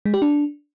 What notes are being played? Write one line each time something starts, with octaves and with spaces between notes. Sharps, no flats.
G#3
G4
D4